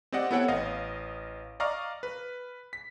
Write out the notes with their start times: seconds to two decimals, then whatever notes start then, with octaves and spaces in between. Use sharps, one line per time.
0.12 C4 G4 D5 D#5 F#5
0.31 B3 E4 A4 C#5 F#5 G5
0.48 A1 D#5 F5
1.60 D5 D#5 F5 A#5 C#6 F6
2.03 B4
2.73 B6